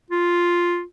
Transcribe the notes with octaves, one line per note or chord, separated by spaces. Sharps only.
F4